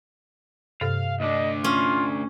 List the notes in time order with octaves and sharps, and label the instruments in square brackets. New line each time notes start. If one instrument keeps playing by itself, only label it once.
[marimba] G2 C3 A4 [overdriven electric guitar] F5
[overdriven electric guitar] D2 D4 [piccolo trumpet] D#5
[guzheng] C#4 [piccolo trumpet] F4